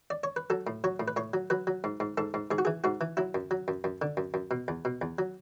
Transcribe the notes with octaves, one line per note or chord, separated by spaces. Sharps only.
D5
C#5
B4
F#3 A4
A2
F#3 C#5
A2
B4
A2 C#5
F#3
F#3 B4
F#3
G#2
G#2
G#2 A4
G#2
G#2 G#4
F#4
E3 G#4
G#2 F#4
E3
F#3 E4
F#2
F#3
F#2
F#2
D3
F#2
F#2
B2
E2
B2
E2
F#3